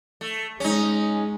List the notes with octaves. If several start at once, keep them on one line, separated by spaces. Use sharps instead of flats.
A3
G#3 C#4 D#4